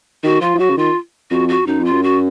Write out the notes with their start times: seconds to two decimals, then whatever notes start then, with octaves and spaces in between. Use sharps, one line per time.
0.24 D#3 F#4
0.41 F3 F4
0.55 F3
0.59 F#3 F#4
0.70 C#3
0.77 D#3 F4
1.31 F2 F#4
1.49 F#4
1.67 F#2 D#4
1.80 F2
1.85 F4
1.91 F#2
2.03 F#4